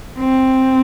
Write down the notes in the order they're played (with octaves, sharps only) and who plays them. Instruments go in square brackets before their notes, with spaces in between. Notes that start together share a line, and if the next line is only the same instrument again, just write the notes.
[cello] C4